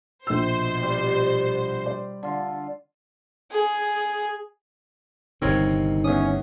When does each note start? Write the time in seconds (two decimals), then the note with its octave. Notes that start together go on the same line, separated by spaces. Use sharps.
0.27 A#1 B2 C5 E6
0.82 G3
1.86 D5
2.23 D3 F4
3.52 G#4
5.42 G1 C3 D#3 C4 A#4 C#5
6.04 E2 C#4 D#6